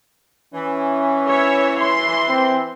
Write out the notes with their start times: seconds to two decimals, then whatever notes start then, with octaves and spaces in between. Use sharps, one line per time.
0.54 E3 C#4
1.28 C#5 E5
1.80 C6
2.29 C4